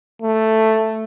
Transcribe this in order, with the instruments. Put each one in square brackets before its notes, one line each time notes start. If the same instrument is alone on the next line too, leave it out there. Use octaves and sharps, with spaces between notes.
[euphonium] A3